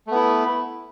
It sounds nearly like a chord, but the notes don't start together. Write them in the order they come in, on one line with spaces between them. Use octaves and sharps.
A3 B3 E4